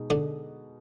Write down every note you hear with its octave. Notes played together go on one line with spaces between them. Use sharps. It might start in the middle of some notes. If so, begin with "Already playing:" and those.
Already playing: B2 G#3 D#4 G#4
D3 D4